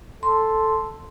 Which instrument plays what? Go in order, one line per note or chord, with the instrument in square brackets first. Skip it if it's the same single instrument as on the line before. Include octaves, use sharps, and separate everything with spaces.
[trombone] A4 [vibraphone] C6